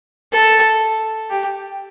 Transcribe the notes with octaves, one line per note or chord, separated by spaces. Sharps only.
A4
G4